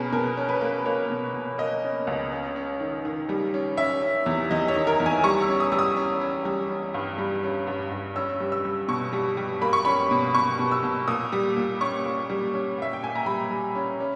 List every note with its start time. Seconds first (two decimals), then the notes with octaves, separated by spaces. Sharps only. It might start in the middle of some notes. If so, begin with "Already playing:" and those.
Already playing: B2 C#4 G#4 A#4 B4
0.13 B2 A#4
0.37 C#4
0.49 B4
0.61 A#3
0.85 A#3 C#5
1.10 B2
1.34 B2
1.58 A#3 D#5
1.84 C#4
2.07 C#2
2.32 C#4
2.56 C#4
2.80 D#3
3.05 D#3
3.29 G3
3.54 C#4
3.77 C#4 E5
4.02 C#4
4.26 E2
4.51 E2 D#5
4.68 C#5
4.75 D#3
4.87 A#4
5.00 E2
5.06 G#5
5.23 G3 C#6
5.42 E6
5.48 C#4
5.60 D#6
5.72 G3 E6
5.79 D#6
5.97 C#4
6.21 C#4
6.45 G3
6.70 C#4
6.94 G2
7.18 G3
7.43 C#4
7.67 G2
7.91 G2
8.16 C#4 E6
8.40 G3
8.52 E6
8.65 G3
8.88 B2 C#6
9.13 G3
9.37 G3
9.61 A#3 B5
9.73 C#6
9.85 C#4 B5
10.11 B2
10.35 B2 C#6
10.59 B2
10.71 E6
10.83 B2
11.08 A#2 D#6
11.32 G3
11.57 A#2
11.81 C#4 C#6
12.05 A#2
12.30 G3
12.54 C#4
12.78 A#2 E5
12.93 G5
13.03 A#2 G#5
13.16 A#5
13.26 G3 B5
13.51 G3
13.75 C#4
14.00 C#4